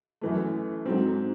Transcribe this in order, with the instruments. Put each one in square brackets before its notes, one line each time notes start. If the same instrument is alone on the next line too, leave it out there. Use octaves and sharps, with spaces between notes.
[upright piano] F#2 E3 A3
G#2 F#3 C4